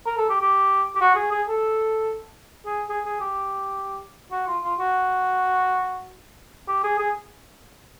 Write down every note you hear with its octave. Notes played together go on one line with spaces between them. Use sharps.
A#4
A4
G4
G4
G4
F#4
G#4
G#4
A4
G#4
G#4
G#4
G4
F#4
F4
F4
F#4
G4
G#4
G#4